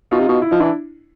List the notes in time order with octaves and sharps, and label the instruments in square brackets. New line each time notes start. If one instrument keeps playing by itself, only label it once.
[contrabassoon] B2 [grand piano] D#4 F4
[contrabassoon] C3
B2
[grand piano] E4
[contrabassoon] F3 [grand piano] D#4
[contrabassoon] E3 [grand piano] D4 E4